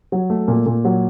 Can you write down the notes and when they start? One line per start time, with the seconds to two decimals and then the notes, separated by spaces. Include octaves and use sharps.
0.12 F#3
0.30 A3
0.48 A#2
0.66 A#2
0.85 F#3